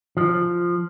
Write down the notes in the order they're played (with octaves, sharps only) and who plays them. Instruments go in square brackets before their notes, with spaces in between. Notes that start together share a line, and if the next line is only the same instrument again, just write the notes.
[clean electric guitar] F3